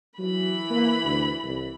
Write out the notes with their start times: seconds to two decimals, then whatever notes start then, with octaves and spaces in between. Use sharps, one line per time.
0.19 E3 F#3 B5
0.70 A#3
1.04 D2
1.44 C2